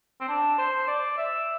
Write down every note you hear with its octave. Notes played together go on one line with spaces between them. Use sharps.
C4
D4
C5
D5
E5